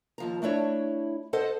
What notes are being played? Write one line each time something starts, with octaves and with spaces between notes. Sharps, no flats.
D#2 F3 A#5
A3 D4 E4 C#5
A4 C5 D#5 F#5